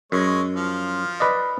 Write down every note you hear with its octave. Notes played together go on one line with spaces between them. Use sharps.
F#2 G#3 C#5
F3 F6
B4 D5 D#5